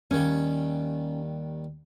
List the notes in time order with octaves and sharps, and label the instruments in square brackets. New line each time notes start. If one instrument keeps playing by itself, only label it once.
[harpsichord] D#2 D#3 G3 [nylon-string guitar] C#4